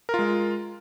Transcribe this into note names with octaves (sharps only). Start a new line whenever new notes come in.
G#3 F4 A#4